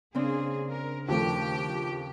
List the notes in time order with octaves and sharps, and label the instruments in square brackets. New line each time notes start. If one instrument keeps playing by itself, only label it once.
[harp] C#3 C4 D4 [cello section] A#3 G#4
[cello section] A#4
[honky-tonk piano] D#2 F3 A3 [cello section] G4